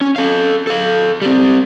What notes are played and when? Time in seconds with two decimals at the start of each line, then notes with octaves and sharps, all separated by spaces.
0.01 C#4
0.16 A4 F5
0.67 A4 F5
1.22 G3 C4